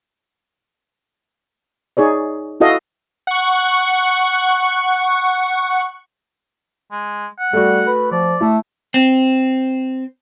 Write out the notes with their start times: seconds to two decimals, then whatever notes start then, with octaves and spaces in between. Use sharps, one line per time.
1.97 D#4 G#4 C#5 D5
2.60 E4 F#4 A4 D#5 F5
3.27 F#5 C#6
6.92 G#3
7.39 F#5
7.53 G3 A3 F#4
7.87 B4
8.12 F3 D5
8.41 A3 E4
8.94 C4